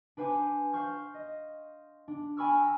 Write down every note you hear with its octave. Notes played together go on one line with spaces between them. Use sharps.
D4 B4 C5 F#5 G#5 D6
C5 F5 F#5 C#6 F6 G6
D#5
D4
G5 G#5 B5 C#6 E6 F6
A#5 E6 F#6